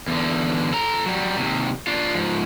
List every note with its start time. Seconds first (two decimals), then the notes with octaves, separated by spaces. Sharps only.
0.08 E2 D3
0.73 A4 A#5
1.06 F#3 G3
1.37 D#2 C3
1.87 D4 F4
2.15 G#2 F3